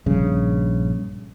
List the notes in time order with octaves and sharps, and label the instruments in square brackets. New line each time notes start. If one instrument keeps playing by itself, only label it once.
[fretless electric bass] A#1 G2 C#3